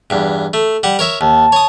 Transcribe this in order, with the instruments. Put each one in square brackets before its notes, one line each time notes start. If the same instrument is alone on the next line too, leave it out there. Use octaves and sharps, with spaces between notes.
[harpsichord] E2 G2
A3
G3 F#5
A#4 C#5 E5
[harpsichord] D#2 [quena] A5
[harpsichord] C#5 D#6